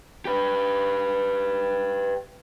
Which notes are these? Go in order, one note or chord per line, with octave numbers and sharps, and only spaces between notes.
G4 B4